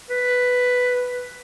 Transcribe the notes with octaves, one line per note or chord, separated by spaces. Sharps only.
B4